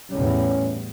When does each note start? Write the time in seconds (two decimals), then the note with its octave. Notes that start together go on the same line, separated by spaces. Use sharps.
0.12 E2 A2 G3 C#4